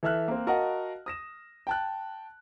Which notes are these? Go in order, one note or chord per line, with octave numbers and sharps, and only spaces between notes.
E3 A4 E5 F6 F#6
A#3 C4
F#4 A#4 D#5 F5 F#5 A5
D#6 A#6 E7
G5 A5 F#6